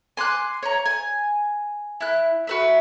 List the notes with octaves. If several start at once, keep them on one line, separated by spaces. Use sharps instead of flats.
G#5 C6 D6 F#6
C#5 A#5
G#5
E4 F#6
F#4 B4 E5